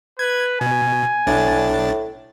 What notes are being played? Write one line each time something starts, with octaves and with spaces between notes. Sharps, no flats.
B4 G#6
B2 G#5
B1 A2 D4 A6